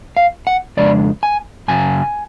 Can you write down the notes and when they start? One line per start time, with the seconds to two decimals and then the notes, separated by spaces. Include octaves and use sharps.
0.17 F5
0.47 F#5
0.77 F2 C#3 G#3 D4 D5
1.23 G#5
1.68 F#2 C#3 F#3 G#5